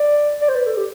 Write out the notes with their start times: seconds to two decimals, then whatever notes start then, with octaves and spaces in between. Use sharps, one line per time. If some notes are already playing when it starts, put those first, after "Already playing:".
Already playing: D5
0.41 D5
0.49 C5
0.56 B4
0.66 A4
0.77 G4